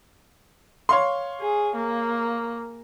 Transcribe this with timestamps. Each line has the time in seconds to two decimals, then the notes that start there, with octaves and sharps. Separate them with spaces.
0.89 C#5 F5 C6
1.40 G#4
1.75 A#3